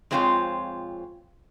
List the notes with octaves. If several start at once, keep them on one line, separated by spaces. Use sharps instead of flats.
F2 G#3 C4 F4 C5 C#5